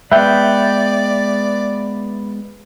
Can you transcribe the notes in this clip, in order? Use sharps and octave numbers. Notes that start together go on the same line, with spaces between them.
G#3 B3 B4 D5 E5 G5